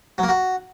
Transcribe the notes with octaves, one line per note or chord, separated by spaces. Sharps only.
F#3
A#3
F#4